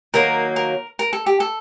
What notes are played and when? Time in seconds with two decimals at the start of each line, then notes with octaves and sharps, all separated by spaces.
0.14 D#3 F#3 A#3 A#4
0.56 A#4
0.99 A#4
1.13 A4
1.26 G4
1.40 A4